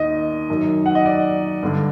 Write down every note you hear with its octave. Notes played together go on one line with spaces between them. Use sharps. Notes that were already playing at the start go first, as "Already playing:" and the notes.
Already playing: D#2 D#3 D#5
F#2 D#3
F#5
D#5
D5
G2 D3